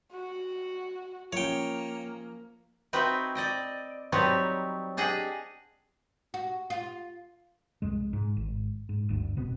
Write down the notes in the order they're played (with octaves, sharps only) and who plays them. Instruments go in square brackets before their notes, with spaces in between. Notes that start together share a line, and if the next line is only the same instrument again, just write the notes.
[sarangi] F#4
[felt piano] F3 C#4 [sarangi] A#3 [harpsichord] C#5 G5
[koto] C4 D#4 E4 F#4 B4 G5
D5 D#5 G5
F#3 G3 C4 D#4 B4 C#5
D4 G4 G#4 D#5 F#5
[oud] F#4
F4
[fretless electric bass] C2 F2 G#3
G#2
G#1
G#2
G1 D2
D#1 B2 B3 C4